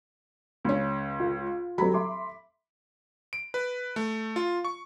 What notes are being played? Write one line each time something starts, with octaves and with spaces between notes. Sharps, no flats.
C#2 C#4
F4
F#3 G3 C4 B5
E5 C6 D6
D7
B4
A3
F4
C#6